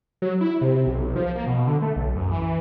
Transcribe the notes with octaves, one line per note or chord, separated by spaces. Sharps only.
F#3
E4
C3
B1
F3
A#3
B2
D3
A3
B1
F#2
E3